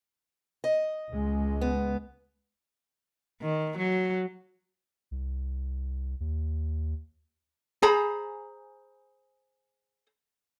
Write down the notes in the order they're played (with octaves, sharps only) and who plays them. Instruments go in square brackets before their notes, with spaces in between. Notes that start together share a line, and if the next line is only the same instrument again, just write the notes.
[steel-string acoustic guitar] D#5
[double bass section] C#2 G#3
[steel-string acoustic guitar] B3
[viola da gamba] D#3
F#3
[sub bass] C2
D#2
[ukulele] G#4 C5 A#5 B5